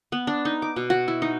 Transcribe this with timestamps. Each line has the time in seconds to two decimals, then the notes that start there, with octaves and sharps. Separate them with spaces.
0.12 B3
0.27 D4
0.45 D#4
0.62 D6
0.76 B2
0.90 F#4
1.08 E4
1.22 D#4